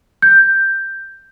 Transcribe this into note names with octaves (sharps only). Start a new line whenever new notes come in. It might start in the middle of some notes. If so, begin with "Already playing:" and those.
G6